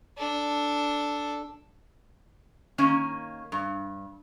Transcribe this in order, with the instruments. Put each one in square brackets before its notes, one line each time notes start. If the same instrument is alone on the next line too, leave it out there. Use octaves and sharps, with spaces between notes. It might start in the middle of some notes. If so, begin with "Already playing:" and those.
[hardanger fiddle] D4 A4
[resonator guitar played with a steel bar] D#3 A#3 C#4
G2